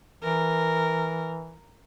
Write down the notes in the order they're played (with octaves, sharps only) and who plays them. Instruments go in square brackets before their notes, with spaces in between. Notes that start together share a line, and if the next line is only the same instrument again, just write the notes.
[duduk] E3 [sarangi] A#4